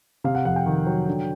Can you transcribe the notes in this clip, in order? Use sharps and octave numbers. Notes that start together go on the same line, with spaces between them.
C3 F5
F#5
F2 F#5
G5
D#3
F#3
D3